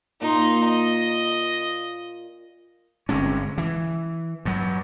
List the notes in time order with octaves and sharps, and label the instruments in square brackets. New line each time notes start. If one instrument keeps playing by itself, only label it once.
[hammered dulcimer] A#2 [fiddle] D#4 C6
[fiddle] D#5
[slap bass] G1 C3 G#3 C#4
E3
G2 F#3